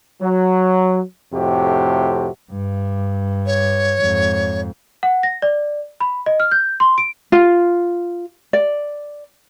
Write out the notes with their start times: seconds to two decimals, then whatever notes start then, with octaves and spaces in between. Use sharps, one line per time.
0.21 F#3
1.34 F2 A2 C3 F#4 G4
2.52 G2
3.46 C#5
4.01 F2 G#2
5.03 F#5
5.23 A#6
5.42 D5
6.00 B5
6.26 D#5
6.40 F6
6.51 G6
6.80 C6
6.98 D7
7.32 F4
8.53 D5